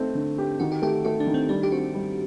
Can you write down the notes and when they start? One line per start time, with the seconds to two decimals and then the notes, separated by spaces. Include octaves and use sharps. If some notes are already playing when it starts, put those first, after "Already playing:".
Already playing: A3 C4 D#4
0.15 D3
0.38 G4
0.60 D#3 F#4
0.72 G4
0.82 A3 G4
1.05 A3 F#4
1.20 D4
1.27 D#3
1.34 C4
1.49 G3 D4
1.63 G4
1.72 C4 F#4
1.94 G3